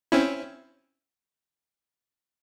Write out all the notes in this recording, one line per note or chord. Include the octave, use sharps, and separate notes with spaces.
C4 C#4 E4